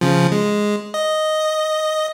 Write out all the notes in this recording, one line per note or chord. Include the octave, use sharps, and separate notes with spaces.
C#3 F3
G#3
D#5